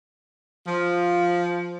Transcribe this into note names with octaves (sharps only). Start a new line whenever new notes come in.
F3